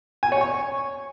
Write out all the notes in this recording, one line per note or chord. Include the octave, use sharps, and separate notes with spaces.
G#5
C#5
C#6